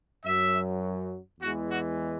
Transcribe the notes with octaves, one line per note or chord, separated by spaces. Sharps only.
F#2 F#3 E5
E2 E3 G#3 F#4
F#4